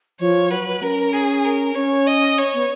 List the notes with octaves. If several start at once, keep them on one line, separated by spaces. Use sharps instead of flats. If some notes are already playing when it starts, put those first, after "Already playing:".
F3 C#5
F#3 B4
C#4 A#4
G#4
A#4
C#4 C#5
D#5
C#5
B3